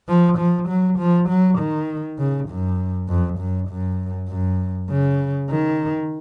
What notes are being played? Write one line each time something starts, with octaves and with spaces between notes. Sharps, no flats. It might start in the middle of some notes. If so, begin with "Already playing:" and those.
F3
F3
F#3
F3
F#3
D#3
C#3
F#2
F2
F#2
F#2
F#2
C#3
D#3